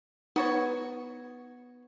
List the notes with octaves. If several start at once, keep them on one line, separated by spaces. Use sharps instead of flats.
B3 D#4 F#4 C#5